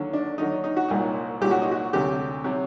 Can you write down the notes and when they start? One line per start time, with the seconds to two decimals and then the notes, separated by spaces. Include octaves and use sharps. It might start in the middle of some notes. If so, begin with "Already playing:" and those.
Already playing: D#2 D3 F#3
0.13 D4
0.38 D#2 D3 F#3 D#4
0.64 D#4
0.76 F#4
0.88 C2 A#2 F#3 D#4
1.41 C2 A#2 F#3 G4
1.51 F#4
1.62 D#4
1.71 F#4
1.93 D2 C3 F#3 G4
2.44 C3 F#3